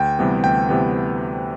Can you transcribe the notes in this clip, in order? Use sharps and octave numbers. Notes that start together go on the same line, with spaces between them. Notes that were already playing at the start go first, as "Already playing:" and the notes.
Already playing: D2 G5
C3 E3 G3 B3
D2 G5
C3 E3 G3 B3